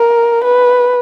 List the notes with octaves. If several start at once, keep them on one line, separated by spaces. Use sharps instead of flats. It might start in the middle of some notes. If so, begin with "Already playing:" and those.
Already playing: A#4
B4